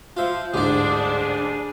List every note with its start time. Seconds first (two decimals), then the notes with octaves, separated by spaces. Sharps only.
0.17 F3 F4 C5 E5
0.54 D1 G#2 G3 D4 G4 G#4 D5